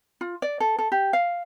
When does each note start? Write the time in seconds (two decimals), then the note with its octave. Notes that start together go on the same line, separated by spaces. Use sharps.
0.21 F4
0.42 D5
0.60 A4
0.79 A4
0.92 G4
1.13 F5